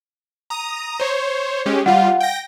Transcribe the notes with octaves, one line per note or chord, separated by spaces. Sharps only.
A#5 D#6
C5 C#5
G#3 C#4 G4
G3 F4 F5 F#5
G5 A#6